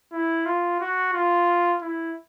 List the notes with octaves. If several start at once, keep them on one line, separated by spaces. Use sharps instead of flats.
E4
F4
F#4
F4
E4